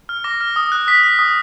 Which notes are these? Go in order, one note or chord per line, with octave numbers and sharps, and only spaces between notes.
F6
D6 A#6
F6
D#6
F#6
D#6 B6
F#6
D#6